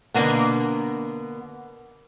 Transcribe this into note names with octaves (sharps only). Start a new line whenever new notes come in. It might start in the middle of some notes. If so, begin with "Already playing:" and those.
B2 D3 G#3 A#3 B3